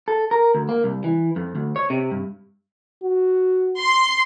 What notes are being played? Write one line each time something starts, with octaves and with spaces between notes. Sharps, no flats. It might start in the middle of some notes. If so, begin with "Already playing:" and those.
A4
A#4
D2
A#3
C2
E3
F2
D2
C#5
C3
G2
F#4
C6